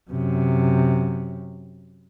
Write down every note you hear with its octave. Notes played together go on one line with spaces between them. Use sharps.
F#2 C3